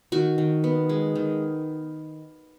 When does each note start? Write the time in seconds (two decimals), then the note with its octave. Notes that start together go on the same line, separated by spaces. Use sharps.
0.12 D#3 F#4
0.38 D#3
0.64 B3
0.89 G#3
1.15 D#3